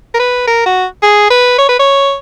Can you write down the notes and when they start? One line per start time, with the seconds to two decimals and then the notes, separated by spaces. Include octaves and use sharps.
0.14 A#4
0.20 B4
0.47 A#4
0.66 F#4
1.02 G#4
1.30 B4
1.58 C#5
1.69 B4
1.79 C#5